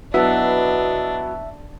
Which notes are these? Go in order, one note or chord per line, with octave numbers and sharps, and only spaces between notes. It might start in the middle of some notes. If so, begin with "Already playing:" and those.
B2 F#3 B3 D4 E4 E5